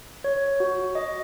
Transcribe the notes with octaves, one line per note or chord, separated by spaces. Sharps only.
C#5
F#4
D#5